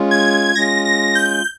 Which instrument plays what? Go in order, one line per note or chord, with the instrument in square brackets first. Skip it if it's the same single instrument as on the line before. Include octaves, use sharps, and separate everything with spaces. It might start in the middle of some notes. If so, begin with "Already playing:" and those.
Already playing: [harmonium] G#3 C#4 F4
[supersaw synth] G#6
[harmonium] G#3 C#4 F4 [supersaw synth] A#6
[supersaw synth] A#6
G6